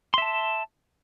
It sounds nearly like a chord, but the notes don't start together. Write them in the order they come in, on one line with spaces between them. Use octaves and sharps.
C6 E5 A5